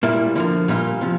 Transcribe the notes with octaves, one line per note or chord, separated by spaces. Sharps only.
A#2 G3 A#3 E4
D3 F3 A#3
A#2 G3 A#3 F4
C3 F3